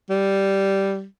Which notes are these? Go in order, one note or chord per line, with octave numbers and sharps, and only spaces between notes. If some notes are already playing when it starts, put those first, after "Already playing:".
G3